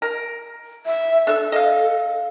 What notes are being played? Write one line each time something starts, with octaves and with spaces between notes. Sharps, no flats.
A#4
E5
D4 A4 E5
D#5 F5